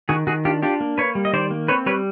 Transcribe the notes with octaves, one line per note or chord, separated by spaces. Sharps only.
D#3 F#4 G#4
D#3 F#4 G#4
D4 F4 G4
D4 F4 G4
A#3
A#3 B4 C#5
G3
D#5
D#3 C5 D5
A#3
C4 B4 C#5
G3 B4 C#5